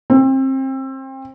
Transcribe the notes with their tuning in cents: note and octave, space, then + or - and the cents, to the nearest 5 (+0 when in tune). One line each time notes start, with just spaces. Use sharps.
C4 +30